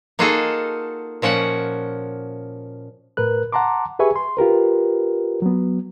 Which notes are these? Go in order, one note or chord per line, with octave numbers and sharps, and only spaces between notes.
A#3 D#4 F4 F#4 G#4 A4
A#2 F3 C#4 F#4 F#5
A2 A#4 B4 F#6
F#5 A5 A#5 C6 D6
G4 G#4 B4 E5 G#5 C#6
C6
F4 G4 A#4 B4
F#3 B3